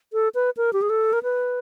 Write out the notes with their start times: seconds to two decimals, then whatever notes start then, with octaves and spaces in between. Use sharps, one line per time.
0.13 A4
0.35 B4
0.57 A#4
0.73 G4
0.82 G#4
0.90 A4
1.13 A#4
1.23 B4